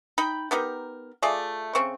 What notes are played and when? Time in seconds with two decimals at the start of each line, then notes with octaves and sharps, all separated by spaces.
0.18 D#4 G5 B5
0.51 B3 D#4 G4 A#4
1.22 A3 F4 G#4 D5
1.75 C#3 C4 C#6